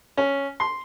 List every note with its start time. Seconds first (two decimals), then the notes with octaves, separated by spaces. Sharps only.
0.17 C#4
0.60 C6